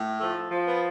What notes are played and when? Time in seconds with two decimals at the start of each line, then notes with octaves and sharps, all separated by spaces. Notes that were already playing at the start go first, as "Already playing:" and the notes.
Already playing: A2
0.20 F3 A3
0.51 F3
0.67 B3